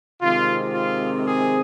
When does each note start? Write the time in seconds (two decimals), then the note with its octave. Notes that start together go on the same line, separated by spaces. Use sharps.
0.21 C3 D#3 G#3 C4 F4
0.74 F4
1.26 G#4